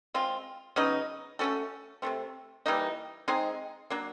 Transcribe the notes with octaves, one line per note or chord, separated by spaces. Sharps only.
G#3 C4 F4
C#3 F#3 B3 D#4
A3 C#4 F#4 A4
C3 F3 A3 C4
E3 G3 A#3 D#4
G#3 C4 D#4 G#4
F#3 A#3 D4